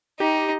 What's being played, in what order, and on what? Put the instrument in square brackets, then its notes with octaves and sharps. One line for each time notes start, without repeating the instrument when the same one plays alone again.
[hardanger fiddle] D#4 [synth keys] G4